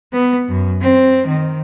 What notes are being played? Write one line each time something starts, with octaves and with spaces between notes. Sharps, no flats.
B3
F#2
C4
D#3